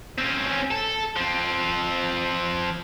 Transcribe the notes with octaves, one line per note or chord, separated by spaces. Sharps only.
C4 C#4
A4
F3 C4